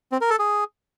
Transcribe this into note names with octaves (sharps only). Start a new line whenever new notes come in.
C4
A#4
A4
G#4